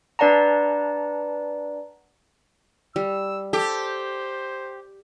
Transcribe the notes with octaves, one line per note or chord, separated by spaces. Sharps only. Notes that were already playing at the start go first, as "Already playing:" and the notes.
D4 B4 D5 F#5 A5 A#5
G3 E6
G4 A4 C5